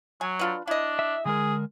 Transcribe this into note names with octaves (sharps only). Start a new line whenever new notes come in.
F#3 G#5
D4 F4 B4
D4 E4 D#5
E5
D3 G#3 G#4 A#4